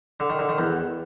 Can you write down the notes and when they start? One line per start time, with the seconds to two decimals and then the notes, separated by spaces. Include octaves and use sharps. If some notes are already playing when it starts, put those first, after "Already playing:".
0.20 D3
0.30 D#3
0.39 D3
0.49 D#3
0.58 E2